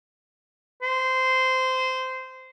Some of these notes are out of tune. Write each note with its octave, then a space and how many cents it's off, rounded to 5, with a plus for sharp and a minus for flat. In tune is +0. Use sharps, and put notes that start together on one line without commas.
C5 -15